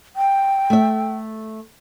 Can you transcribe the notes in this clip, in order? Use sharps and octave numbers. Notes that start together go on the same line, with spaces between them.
G5
A3 E5